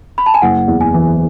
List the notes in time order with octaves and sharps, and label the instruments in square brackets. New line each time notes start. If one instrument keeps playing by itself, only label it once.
[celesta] B5
A5
G#5
[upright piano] F#1 [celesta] F#5
[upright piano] E2
[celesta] G#5
[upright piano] E3